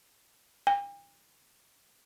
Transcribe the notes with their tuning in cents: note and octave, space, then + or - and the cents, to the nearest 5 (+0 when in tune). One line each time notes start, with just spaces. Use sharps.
G5 +45